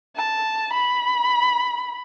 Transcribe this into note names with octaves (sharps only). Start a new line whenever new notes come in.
A5
B5